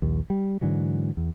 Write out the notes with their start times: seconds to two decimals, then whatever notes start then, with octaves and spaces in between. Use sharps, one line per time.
0.02 A#1 D#2
0.30 G3
0.61 G#2 D3 E3 F#3
1.17 E2